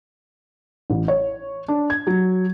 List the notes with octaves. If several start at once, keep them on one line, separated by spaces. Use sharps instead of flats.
A1
C#5
D4
G#6
F#3